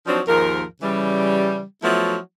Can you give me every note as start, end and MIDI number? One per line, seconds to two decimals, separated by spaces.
0.07 0.21 53
0.07 0.21 54
0.07 0.21 60
0.07 0.21 62
0.07 0.21 63
0.28 0.63 39
0.28 0.63 44
0.28 0.63 53
0.28 0.63 70
0.83 1.62 49
0.83 1.62 52
0.83 1.62 55
1.83 2.17 53
1.83 2.17 54
1.83 2.17 57
1.83 2.17 59
1.83 2.17 64